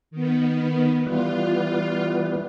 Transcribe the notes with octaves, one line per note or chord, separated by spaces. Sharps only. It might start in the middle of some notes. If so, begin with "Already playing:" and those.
D#3 B3
E3 G3 B3 F4